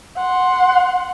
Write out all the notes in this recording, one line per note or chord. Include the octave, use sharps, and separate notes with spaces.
F#5 C6